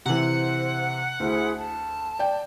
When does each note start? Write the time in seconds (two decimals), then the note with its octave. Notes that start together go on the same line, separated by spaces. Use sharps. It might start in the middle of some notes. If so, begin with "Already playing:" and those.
0.05 C3 E3 C5 F#5
1.20 D2 E4 G#4 C5
1.56 A5
2.19 D5 G5